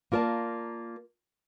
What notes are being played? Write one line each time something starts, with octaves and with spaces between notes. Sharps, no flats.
A#3 F4 A#4 D5 A5